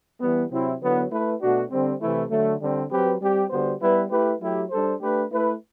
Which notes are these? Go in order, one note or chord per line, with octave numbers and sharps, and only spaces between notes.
E3 G3 B3
C3 F#3 C4 E4
D3 F#3 B3 E4 B4
A3 E4 B4
B2 A3 D4 F#4
D3 G3 C4
C3 E3 A3 E4
D3 F#3 A3
D3 G3 C4
F#3 C4 G4 B4
G3 C4 G4
D3 G3 B3 F#4 C5
G3 B3 E4 B4
A3 E4 G4 B4
F#3 A3 E4 G4
G3 D4 A4 C5
A3 D4 G4 B4
A3 E4 B4